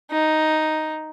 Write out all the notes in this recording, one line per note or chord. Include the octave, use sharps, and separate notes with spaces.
D#4